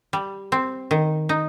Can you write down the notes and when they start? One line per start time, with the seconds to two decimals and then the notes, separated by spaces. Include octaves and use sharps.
0.13 G3
0.52 C4
0.91 D#3
1.29 D#4